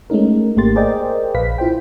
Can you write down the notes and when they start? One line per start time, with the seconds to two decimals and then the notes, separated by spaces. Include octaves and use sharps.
0.10 G#3 A3 C#4 D#4 A#4
0.57 G#1 A3 A#3 G4 C6 A6
0.76 G#4 A#4 C5 D5 D#5 G5
1.34 A#1 B4 F5 B6
1.58 E4 F4 C5 G5